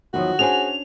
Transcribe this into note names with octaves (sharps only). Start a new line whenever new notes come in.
E2 D#3 F3 F#3 F#4
C#4 D4 G#4 C5 G#5 F7